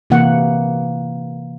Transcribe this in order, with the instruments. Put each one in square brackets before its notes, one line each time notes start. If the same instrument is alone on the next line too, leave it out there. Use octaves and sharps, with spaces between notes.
[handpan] C3 E3 A#3 F#5